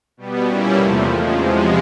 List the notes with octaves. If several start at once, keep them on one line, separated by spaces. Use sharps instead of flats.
B2 G3 B3
A#2 G3 A#3 C#4 E4
E2 C3 F3 A3
C#3 F3 G#3
E2 C3 F3 G#3